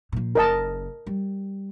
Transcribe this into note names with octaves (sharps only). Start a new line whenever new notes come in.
A#2 F3
F#1 A#4 D#5 A5
G3